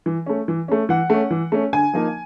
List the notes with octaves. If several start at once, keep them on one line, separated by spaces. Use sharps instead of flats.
E3
A3 C#4
E3
A3 C#4
E3 F#5
A3 C#4
E3
A3 C#4
D3 G#5
F3 A#3 D#4